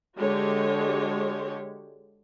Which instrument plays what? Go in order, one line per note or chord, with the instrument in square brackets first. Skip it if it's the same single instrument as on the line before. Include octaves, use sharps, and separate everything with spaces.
[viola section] D3 G#3 F#4 G4 C#5